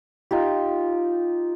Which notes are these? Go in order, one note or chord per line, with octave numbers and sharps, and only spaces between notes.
D#4 F4 G4